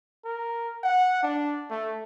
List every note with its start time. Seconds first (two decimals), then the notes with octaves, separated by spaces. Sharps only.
0.25 A#4
0.84 F#5
1.23 D4
1.70 A3